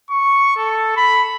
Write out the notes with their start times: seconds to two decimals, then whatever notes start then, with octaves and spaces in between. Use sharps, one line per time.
0.11 C#6
0.57 A4
0.97 B5